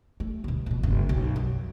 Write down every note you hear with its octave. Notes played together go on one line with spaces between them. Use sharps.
A3
D2 B2
F2 B2
F#1 G2
B1
F#2